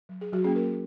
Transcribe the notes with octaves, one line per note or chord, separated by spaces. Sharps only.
F#3
G#4
F#3 F#4
A#3 C#4 G#4
A#3 A#4